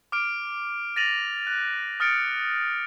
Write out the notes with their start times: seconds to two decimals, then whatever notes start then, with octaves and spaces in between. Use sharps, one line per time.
0.12 D6 F6 D7
0.96 A6 A#6 D#7 F7 F#7
1.47 F#6
2.00 D#6 F6 A6 C#7 D7